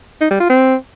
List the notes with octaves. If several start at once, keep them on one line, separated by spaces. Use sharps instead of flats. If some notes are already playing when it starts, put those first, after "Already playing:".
D#4
G3
F4
C4